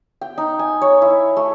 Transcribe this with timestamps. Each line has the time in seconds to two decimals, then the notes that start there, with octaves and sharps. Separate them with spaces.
0.21 G5
0.38 D#4
0.59 G#5
0.82 C#5
1.02 E4
1.36 A3